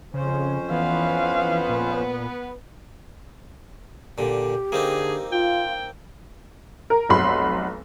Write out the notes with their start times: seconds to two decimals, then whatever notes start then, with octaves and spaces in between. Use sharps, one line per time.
0.14 F2 C#3 C#4 C5
0.71 E3 B3 F5
1.69 A#2
4.18 A#2 D3 G4
4.72 D3 A#3 C4 D#4 G#4
5.32 F4 G5
6.90 A#4
7.09 F1 B1 F#3 B5 C6